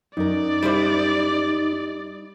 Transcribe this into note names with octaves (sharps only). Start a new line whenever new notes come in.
F#2 D#4 A#4 D5
G3 E4 C5